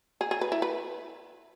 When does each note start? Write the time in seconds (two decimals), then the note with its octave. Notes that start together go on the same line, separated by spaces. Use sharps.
0.21 G#4
0.31 G#4
0.41 B4
0.52 E4
0.62 B4